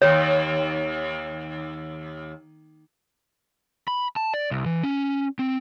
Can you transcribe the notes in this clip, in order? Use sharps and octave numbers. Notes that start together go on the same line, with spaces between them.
D#2 C#5
B5
A5
D5
C2
E3
C#4
C4